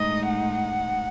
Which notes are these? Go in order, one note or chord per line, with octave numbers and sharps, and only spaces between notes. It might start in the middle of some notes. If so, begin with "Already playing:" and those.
Already playing: A2 G#3 D#4 D#5
F#5